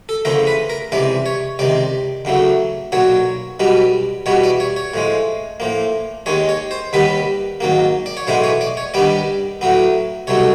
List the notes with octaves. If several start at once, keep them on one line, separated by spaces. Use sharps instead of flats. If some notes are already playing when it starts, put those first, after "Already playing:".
A4
E2 C#3 F3 A3 A#4
B4
A#4
C#2 C3 E3 D5
C#5
C#2 C3 D#3 D5
E2 C#3 F#3 A3
B1 A#2 F#3 C#5
B1 B2 G3 B3
E2 B2 G3 B3 C#5
D5
C#5
C#5
A2 F3 G#3
A2 F3 A#3
D#2 D#3 G#3 C#5
C#5
C5
D#2 D#3 G3 B3 B4
G#2 D#3 F#3 A#3
D5
C#5
B1 A2 E3 G#3 B3 C5
C#5
D5
C#5
G2 D#3 G3 B3 D5
A2 F#3 B3
C2 B2 F#3 A3 C#5